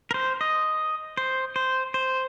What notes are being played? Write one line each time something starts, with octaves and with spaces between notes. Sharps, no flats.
A#4
C5
D#5
C5
C5
C5